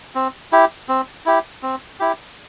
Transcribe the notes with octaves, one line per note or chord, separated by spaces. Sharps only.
C4
E4 G4
C4
E4 G4
C4
E4 G4